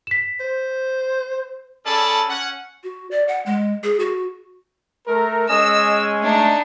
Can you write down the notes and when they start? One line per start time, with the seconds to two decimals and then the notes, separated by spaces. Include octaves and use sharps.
0.07 B6 E7
0.40 C5
1.86 C#4 G#4 A4 D5 A5 B5
2.28 C#4 F#5
2.84 F#4
3.11 D5
3.28 F#5
3.46 G#3
3.84 G#4
4.00 F#4
5.07 A3 A#4
5.49 G#3 C#4 D#5 G#5 E6
6.22 A3 D4 D#4